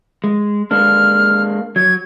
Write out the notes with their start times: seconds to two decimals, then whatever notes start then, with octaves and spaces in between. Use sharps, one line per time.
0.24 G#3
0.71 G#3 A#3 D4 F6
1.76 F#3 G#6